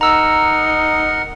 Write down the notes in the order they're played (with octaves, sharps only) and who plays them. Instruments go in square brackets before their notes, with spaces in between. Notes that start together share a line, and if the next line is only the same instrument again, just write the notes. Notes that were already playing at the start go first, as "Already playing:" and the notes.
[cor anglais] D#4 [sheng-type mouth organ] A#4 F#5 [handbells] A#5 E6